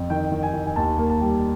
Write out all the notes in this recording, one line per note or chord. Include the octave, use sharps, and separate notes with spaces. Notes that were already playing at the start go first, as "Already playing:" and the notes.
Already playing: F2
D#3 G5
D#3
G#5
D#3
G#5
D#2 A5
A#3
A5
G3